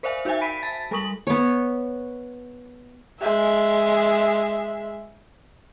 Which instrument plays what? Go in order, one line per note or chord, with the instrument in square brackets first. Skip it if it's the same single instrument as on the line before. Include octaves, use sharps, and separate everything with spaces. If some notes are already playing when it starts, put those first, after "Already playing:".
[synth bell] A#4 C5 D5 E5 F5 G#5
D#4 F#4 C5 E5 G5 G#5
B5 B6 D7 D#7
A5 A6 B6
G3 A4 A#4 C#6 D#6 F#7
[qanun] B3 C#5
[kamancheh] G#3 E5